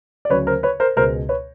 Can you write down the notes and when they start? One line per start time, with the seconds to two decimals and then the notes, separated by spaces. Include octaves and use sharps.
0.25 D5
0.30 D2 C#3 F#3 B4 C#5
0.47 A#4 C5
0.63 B4 C#5
0.80 A#4 C5
0.96 C#2 B2 G#3 A#4 C5
1.29 B4 C#5